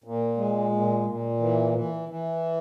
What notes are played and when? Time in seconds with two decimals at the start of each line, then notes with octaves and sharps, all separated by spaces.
0.04 A#2
0.37 G#3
0.72 A#2
1.06 A#2
1.40 E3
1.74 E3
2.09 E3